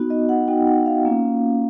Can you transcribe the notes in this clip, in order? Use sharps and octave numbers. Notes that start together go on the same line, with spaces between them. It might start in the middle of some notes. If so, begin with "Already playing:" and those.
Already playing: B3 D#4 F#4
D#5
F#5
B3 D#4 F#4 G5
F#5
F5
A#3 C#4 F4